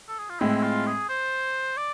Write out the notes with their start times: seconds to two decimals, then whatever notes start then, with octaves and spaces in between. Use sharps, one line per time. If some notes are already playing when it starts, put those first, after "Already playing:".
0.08 A4
0.19 G#4
0.29 F4
0.40 A2 G#3 C4 E4
0.58 E4
0.63 F4
0.86 G#4
1.09 C5
1.77 D5